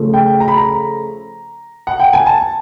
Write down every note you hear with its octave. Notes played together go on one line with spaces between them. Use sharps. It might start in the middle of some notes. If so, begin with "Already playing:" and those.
Already playing: C#3 F3 A3
G5
A#5
B5
A#5
F#5
G5
G#5
A5